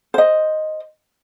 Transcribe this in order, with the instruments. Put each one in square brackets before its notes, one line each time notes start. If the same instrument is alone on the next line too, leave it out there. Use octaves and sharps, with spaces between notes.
[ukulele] C5 D#5